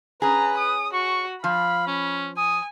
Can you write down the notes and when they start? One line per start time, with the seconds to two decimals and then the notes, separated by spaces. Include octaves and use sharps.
0.22 C#4 G#4 B4 A#5
0.57 D#6
0.93 F#4 C#6
1.44 F3 F5 B5
1.87 C#4
2.37 G#5 D#6